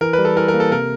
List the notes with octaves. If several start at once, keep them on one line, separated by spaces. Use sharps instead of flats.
E3 A#4
B4
G3
A4
E3 A#4
A#4
A#3
A4
C3 A#4